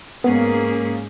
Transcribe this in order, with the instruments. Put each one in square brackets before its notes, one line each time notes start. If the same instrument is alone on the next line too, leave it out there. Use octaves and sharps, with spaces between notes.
[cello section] G#2 C#4 G#4 [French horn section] A#3 [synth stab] B3